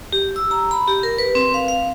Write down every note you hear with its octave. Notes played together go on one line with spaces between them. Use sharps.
G4
E6
A#5
B5
G4
A#4
B4
C4
F5
F5